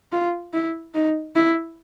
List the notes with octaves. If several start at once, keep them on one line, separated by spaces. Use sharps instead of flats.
F4
E4
D#4
E4